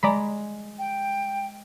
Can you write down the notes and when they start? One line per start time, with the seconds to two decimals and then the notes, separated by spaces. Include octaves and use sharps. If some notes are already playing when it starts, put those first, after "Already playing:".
0.03 G#3 D5 A#5 B5
0.79 G5